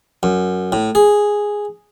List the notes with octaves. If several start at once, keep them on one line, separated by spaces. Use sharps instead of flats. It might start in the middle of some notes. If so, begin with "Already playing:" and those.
F#2
A2
G#4